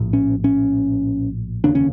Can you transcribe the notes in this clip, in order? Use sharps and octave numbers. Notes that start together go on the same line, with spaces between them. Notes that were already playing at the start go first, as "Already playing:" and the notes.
Already playing: A#1 A2
C#4
C#4
F1 D#2 C#3 D4
C#4